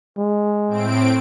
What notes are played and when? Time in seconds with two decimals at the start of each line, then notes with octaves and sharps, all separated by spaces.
0.17 G#3
0.67 A2 C4 D7